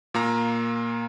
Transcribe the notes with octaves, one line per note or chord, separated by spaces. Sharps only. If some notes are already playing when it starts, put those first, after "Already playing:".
A#2 A#3 A#5